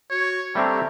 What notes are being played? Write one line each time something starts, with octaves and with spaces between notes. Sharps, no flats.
F#4 C#5
G3 A3 C4 D4 G4 A#5